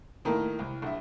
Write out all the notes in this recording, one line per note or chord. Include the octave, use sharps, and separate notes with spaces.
A2 D#3 A#3
C2
A#1 E5